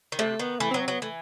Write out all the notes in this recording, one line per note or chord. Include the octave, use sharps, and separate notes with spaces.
D#3
C3 A3
D#3 B3
E3 A3
C4
F#3 B3
C4
F#3 B3
E3 A3